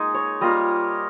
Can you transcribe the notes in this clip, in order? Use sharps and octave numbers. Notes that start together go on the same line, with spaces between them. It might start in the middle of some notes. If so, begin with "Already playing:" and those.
Already playing: G#3 A#3 D#4 G#4
C#5
G3 A#3 F4 D#5